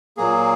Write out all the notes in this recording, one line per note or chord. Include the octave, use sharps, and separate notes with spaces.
A#2 F#3 A#3 G#4